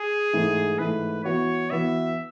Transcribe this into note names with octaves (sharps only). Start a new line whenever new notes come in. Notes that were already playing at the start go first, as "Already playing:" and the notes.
Already playing: G#4
G#2 E3 A3
G#2 E3 A3 B4
E3 B3 F#4 C#5
E3 B3 F#4 E5